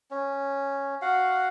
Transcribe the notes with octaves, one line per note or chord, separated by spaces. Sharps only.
C#4
F#4 F5 F#5